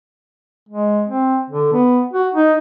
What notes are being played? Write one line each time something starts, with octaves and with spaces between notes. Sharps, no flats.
G#3
C4
D3
B3
F#4
D#4